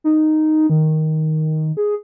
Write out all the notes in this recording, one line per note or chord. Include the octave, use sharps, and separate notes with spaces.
D#4
D#3
G#4